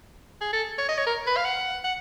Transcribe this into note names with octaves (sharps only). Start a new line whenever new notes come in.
G#4
A4
C#5
D#5
C#5
A#4
B4
F5
F#5
F#5